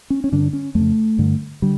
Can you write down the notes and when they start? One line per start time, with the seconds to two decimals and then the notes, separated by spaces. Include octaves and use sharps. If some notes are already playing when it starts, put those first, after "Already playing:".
0.10 C#4
0.24 C#4
0.32 G2 D3 D4
0.53 C#4
0.75 F2 C#3 A3
1.19 G2 D3
1.62 D3 G3